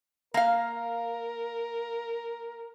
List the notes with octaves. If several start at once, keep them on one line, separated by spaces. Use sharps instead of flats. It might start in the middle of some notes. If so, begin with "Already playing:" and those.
A#3 A#4 F5